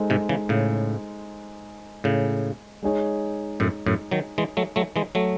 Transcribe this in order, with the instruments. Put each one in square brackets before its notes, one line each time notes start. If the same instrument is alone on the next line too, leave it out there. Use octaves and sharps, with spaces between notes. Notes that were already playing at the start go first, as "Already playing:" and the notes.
Already playing: [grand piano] G#3 D#4 A4 C5
[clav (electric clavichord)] G#2 C3
C#3 E3
A2 C#3
A2 C#3
[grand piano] G#3 D#4 G#4 C#5
[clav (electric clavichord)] F#2 A2
F#2 A2
D#3 F#3
E3 G#3
F#3 A3
F#3 A3
E3 G#3
F#3 A3